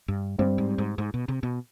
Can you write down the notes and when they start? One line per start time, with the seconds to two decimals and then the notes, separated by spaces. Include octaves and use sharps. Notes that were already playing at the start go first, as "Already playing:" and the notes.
0.08 G2
0.38 G2 G3 C4 G4 C5
0.58 G#2
0.78 G#2
0.98 G#2
1.14 B2
1.28 C3
1.43 B2